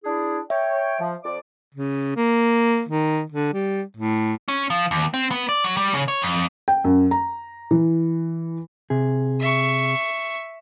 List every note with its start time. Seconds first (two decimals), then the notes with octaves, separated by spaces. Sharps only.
0.04 D4 E4 G#4
0.50 C#5 E5 G5
1.00 F3
1.24 F2 D5 D6
1.75 C#3
2.17 A#3
2.89 D#3
3.32 D3
3.54 G3
3.97 A2
4.48 C#4
4.70 F3
4.91 D#2
5.14 C4
5.31 B3
5.49 D5
5.64 F#3
5.77 G3
5.94 C#3
6.08 C#5
6.22 F2
6.68 G5
6.84 F#2
7.11 A#5
7.71 E3
8.90 C3 G#4
9.41 E5 C#6